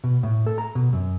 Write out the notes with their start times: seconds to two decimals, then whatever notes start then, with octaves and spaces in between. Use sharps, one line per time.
0.04 B2
0.23 A2
0.46 A4
0.58 A#5
0.75 B2
0.93 F#2